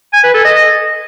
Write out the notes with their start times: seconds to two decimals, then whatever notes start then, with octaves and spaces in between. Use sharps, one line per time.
0.13 G#5
0.24 B4
0.34 A4
0.45 D#5